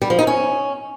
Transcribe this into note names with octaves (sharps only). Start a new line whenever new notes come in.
G3
F3
D#4
C#4